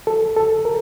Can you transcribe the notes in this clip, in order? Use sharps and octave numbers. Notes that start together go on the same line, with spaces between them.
A4
A4
A#4